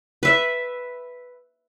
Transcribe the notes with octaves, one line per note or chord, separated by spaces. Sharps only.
B4 E5